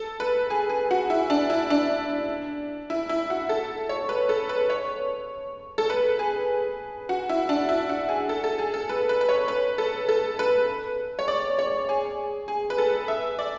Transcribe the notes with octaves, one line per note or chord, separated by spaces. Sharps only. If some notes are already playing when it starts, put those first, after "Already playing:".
Already playing: A4
B4
G#4
G#4
F#4
E4
D4
E4
D4
E4
E4
F#4
A4
C#5
B4
A4
B4
C#5
A4
B4
G#4
F#4
E4
D4
E4
F#4
G#4
A4
A4
G#4
A4
B4
B4
B4
C#5
B4
A4
A4
B4
C#5
D5
C#5
G#4
G#4
B4
A4
E5
D5